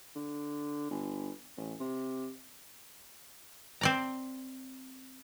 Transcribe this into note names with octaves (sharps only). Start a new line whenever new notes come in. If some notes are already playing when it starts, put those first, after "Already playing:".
D3
G1
A1
C3
C4 D5 A#5